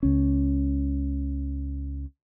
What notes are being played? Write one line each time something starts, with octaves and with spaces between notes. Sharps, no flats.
C#2 C#4